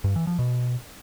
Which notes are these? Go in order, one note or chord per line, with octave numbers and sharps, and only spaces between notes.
G2
E3
F3
B2